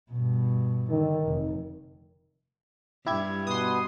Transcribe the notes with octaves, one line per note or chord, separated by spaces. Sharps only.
G2 B2
D3 D#3
F1
G2 E4 G4 G#6
B2 B3 B4 C6 D#6